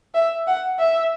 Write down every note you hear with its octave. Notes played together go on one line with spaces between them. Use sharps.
E5
F#5
E5